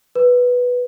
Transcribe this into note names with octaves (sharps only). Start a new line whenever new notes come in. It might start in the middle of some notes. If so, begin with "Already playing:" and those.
B4